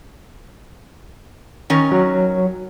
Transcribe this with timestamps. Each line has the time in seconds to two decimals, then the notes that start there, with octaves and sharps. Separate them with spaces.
1.70 D#3 C#4 A#4
1.92 F#3